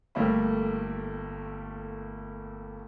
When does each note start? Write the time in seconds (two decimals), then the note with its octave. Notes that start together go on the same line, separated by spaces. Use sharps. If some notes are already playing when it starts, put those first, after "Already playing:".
0.15 G1 G3 A3 A#3 E5 B5